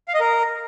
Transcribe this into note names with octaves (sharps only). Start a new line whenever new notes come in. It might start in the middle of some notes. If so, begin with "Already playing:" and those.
F5
D#5
A#4